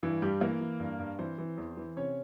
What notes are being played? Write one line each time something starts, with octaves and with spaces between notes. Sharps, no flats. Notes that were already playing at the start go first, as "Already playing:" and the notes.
G2 E3 E4
G2 G3 G4
E3 A#3 A#4
E3
G2
G2
E3 C4 C5
E3
E2
E3
C3 C#4 C#5